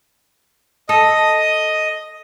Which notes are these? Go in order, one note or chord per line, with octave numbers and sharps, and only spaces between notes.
A4 D#5 D#6